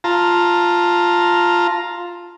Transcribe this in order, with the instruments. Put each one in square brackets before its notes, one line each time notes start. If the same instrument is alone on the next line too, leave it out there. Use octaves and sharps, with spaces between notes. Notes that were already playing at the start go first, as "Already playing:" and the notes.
[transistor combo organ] F4 A5 A#5